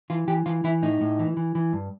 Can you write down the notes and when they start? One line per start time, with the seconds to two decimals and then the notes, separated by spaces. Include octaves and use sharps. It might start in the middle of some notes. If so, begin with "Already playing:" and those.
0.10 E3 F4
0.28 E3 G4
0.46 E3 F4
0.64 E3 E4
0.82 A2 D#4
1.01 A2
1.19 E3
1.37 E3
1.55 E3
1.73 G2